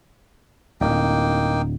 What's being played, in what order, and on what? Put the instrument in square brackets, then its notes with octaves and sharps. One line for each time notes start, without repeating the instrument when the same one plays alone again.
[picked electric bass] D1 [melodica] A#3 D#4 G5